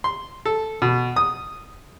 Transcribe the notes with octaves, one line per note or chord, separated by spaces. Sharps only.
C6
A4
B2
D#6